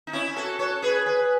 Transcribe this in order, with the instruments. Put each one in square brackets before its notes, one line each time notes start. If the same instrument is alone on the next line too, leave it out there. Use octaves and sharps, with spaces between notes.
[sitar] D#4
C#4 E4
F#4 A4
A4 C#5
G#4 B4
G#4 B4